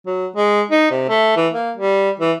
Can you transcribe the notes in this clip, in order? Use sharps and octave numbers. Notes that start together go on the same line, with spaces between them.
F#3
G#3
D#4
C3
A3
E3
A#3
G3
E3